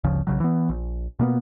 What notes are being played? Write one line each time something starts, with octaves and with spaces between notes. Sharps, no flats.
G1 D2 C#3 F3
B1 C#3 F#3
E3 B3
A#1
B2 A#3 B3